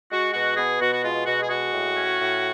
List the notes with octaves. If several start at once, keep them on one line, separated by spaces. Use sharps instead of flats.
G#3 F#4
B2 F#4
B3 G#4
B2 F#4
F#4
G#3 F4
B2 F#4
G#4
G#3 F#4
A2
C#4
A2